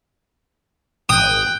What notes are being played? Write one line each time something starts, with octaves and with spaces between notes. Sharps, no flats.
G#1 G5 D#6 F#6